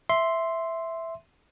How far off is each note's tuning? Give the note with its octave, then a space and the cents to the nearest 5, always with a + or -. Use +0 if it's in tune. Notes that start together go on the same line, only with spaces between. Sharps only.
E5 +0 C6 +0